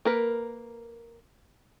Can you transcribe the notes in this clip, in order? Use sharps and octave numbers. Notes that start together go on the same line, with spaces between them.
A#3 A#4 B4